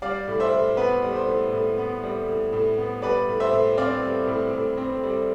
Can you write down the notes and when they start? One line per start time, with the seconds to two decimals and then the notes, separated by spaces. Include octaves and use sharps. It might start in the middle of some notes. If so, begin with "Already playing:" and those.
0.02 G3 D5 F5
0.28 A2
0.40 C5 E5
0.53 A2
0.77 B3 B4
1.02 G3
1.16 C5
1.28 A2
1.53 A2
1.78 B3
2.03 G3
2.28 A2
2.53 A2
2.77 B3
3.02 G3 B4 D5
3.28 A2
3.40 C5 E5
3.53 A2
3.77 C4 D5 F5
4.02 G3
4.27 A2
4.53 A2
4.77 C4
5.03 G3